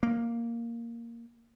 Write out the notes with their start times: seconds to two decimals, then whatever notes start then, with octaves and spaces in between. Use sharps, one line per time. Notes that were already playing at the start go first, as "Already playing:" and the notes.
0.03 A#3